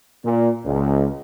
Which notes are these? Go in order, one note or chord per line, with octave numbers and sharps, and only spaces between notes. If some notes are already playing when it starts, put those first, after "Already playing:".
A#2
C#2